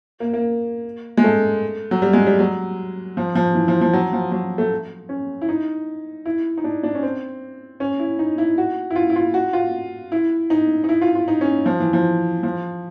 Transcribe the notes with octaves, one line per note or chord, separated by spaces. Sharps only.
A#3
A#3
G#3
A3
F#3
G3
G#3
G3
F#3
F3
F3
E3
F3
F3
F#3
F3
F#3
A3
C#4
E4
D#4
E4
D#4
D4
D4
C#4
C4
C#4
E4
D#4
E4
F#4
E4
F4
E4
F4
F#4
F4
E4
D#4
D#4
E4
F4
F4
D#4
C#4
F3
E3
F3
F3